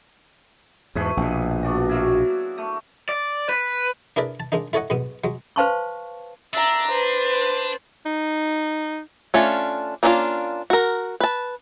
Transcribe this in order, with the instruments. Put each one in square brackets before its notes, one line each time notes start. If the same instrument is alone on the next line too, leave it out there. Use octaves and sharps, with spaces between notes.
[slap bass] E2 G#2 [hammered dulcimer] A3 G#4 B4
[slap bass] A#1 B2
[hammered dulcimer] B3 D4 F#4
F#3 A#3 E4
A3
[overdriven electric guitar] D5
B4
[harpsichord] D4 E4 G#4 A#4 B4 D5
A5
G#3 A#3 D4 D#4
E4 A4 C#5 D#5 F#5
B1 G#2 B3 D#6
F#3 G#3
[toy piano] B4 C5 F5 A5 C6 C#6
[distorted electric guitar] D4 [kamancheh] E5 A#5
[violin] B4 [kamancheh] C5
[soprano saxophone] D#4
[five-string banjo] A3 C#4 D4 F4
A#3 C#4 D4 E4 F4
F#4 A#4
B4 A5